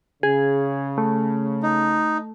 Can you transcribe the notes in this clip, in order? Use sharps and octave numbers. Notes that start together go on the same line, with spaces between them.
C#3 G#4
A3
D#4